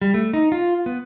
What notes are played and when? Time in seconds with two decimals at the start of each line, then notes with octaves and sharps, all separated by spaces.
0.02 G3
0.14 A3
0.33 D#4
0.52 F4
0.86 B3